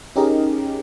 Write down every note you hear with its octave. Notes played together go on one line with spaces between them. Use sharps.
C#4 D#4 G4 G#4 A#4 D#5